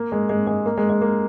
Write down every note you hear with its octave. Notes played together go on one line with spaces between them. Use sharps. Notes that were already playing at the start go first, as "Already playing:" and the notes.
Already playing: A#3
G#3
G#3
G#3
A#3
G#3
G#3
A#3